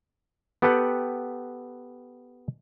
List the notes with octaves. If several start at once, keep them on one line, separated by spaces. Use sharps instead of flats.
B3 G4 A4 B4 F#5 G5